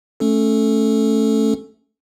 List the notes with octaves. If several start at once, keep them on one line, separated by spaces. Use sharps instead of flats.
A3 C#4 A4